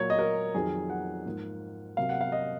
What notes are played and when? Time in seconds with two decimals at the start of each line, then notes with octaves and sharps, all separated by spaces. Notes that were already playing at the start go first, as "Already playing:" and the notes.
Already playing: A#2 F#3 A#3 C#5
0.10 D#5
0.19 A#4
0.54 F2 D#3 F#3 G#4
0.90 F#5
1.26 G#2 F3 A#3
1.97 C3 F#3 A#3 F5
2.09 F#5
2.21 F5
2.32 D#5